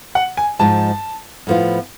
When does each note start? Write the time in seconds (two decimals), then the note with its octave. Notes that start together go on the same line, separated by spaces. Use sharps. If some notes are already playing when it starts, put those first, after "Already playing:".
0.15 F#5
0.37 G#5
0.59 G#2 F3 G#3 A5
1.47 A2 F3 B3 F4